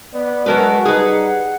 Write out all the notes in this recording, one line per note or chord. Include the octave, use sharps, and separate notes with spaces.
B3 D5
F#3 G#3 F#4 A#4 B4 F#5 A5
G3 D#4 G#4 B4 F#5